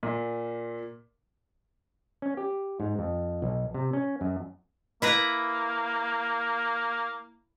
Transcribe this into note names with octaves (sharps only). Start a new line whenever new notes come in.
A#2
C#4
G4
G#2
F2
B1
C3
C#4
F#2
A#3 E4 B4 A#5